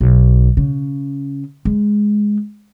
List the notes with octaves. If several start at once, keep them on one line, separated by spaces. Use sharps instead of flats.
B1
C#3
G#3